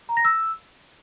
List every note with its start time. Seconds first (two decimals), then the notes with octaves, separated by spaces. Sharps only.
0.09 A#5
0.17 A#6
0.25 E6